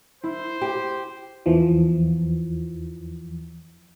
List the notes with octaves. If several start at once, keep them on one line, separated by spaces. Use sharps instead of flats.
E4 C5
G4
E2 E3 F3